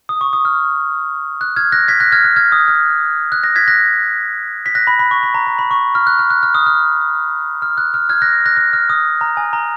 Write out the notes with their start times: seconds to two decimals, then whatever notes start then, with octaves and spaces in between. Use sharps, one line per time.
0.09 D#6
0.21 C#6
0.33 D#6
0.45 F6
1.41 F#6
1.56 F6 G#6
1.72 F#6 A#6
1.88 G#6 B6
2.00 F#6 A#6
2.12 F6 G#6
2.24 F#6
2.36 F6 G#6
2.52 D#6
2.68 F6
3.32 F#6
3.43 F#6 A#6
3.56 G#6 B6
3.68 F#6 A#6
4.66 B6
4.75 F#6 A#6
4.87 B5
4.99 B5
5.11 C#6
5.23 B5
5.34 A#5
5.47 A#5
5.59 B5
5.71 C#6
5.95 F6
6.07 F#6
6.19 F6
6.30 F#6
6.43 F6
6.55 D#6
6.66 F6
7.62 F6
7.78 F#6
7.94 F6
8.09 F6 G#6
8.22 F#6 A#6
8.46 F#6 A#6
8.57 F#6
8.73 F6
8.90 D#6
9.21 A#5
9.37 G#5
9.53 A#5